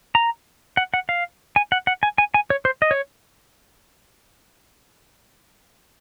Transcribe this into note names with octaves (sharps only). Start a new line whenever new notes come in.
A#5
F#5
F#5
F5
G#5
F#5
F#5
G#5
G#5
G#5
C#5
C5
D#5
C#5